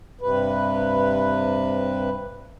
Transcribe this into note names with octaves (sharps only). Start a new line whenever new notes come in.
G2 C3 B4